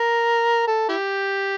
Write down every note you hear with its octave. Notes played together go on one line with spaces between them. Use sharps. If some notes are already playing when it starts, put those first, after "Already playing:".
Already playing: A#4
A4
E4 G4